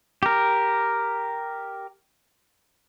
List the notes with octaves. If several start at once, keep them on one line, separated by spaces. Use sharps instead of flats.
G4 A#4